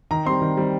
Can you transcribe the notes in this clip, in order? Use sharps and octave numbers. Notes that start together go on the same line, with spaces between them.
D#3 A#5
G3 C4 C6
D#3
G3 C4